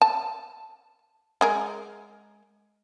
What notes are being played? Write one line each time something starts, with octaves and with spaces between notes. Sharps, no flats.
A5
G#3 G#4 A#4